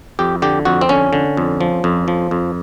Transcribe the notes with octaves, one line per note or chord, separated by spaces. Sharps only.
F2 G4
D3 G4
F2 F#4
C4
D3 C#4
D3
F2
F3
F2
F3
F2